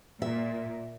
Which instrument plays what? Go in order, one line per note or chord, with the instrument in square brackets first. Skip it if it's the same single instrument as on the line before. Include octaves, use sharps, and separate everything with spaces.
[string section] A#2 [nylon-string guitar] E5